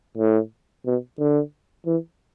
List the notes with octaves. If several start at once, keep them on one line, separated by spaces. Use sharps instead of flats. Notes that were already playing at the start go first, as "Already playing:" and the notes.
A2
B2
D3
E3